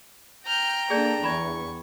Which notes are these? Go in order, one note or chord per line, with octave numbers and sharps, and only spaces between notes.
G5 A#5 F6 G6
A#3 D4 G#4 A4 D5 G6
E2 B5 C#6 G#6